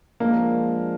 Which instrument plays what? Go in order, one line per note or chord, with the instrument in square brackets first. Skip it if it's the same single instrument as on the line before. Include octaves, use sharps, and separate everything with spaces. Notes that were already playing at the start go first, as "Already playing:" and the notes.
[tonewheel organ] F3 G#3 D4 [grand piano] A#3